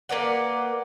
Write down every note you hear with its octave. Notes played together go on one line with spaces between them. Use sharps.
A#3 B4 D5 F#5